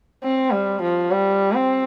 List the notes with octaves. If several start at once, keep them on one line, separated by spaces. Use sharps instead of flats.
C4
G3
F3
G3
C4